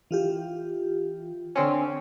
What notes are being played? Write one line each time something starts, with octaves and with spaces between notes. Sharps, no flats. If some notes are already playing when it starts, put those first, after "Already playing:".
E3 F4 G4
D3 C4 C#4